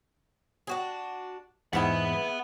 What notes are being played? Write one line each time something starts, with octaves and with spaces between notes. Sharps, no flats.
D4 F#4 G#4
E2 G#2 B3 E4 G#4 F#5 B5